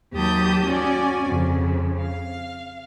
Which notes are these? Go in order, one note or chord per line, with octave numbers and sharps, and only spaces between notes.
D#2 F#3 G4 A5 D#6 G6
C#4 F#4 D5 G#5
F2 C#3
F5